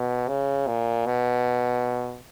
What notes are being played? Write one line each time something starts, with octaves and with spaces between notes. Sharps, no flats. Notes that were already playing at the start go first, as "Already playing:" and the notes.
Already playing: B2
C#3
A#2
B2